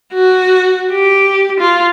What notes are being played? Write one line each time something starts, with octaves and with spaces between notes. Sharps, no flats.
F#4
G4
F4